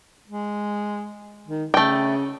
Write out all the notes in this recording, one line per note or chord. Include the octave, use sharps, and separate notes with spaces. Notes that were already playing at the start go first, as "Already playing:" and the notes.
G#3
D#3
C#3 A3 G5